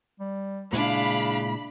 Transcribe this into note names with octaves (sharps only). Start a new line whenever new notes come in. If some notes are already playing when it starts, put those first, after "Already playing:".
G3
A#2 C#3 G#3 D4 E4 F5 B5